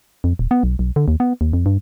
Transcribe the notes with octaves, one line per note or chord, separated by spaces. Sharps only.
F2
D#1
B3
B1
B1
D3
D#2
B3
D#2
F2
G2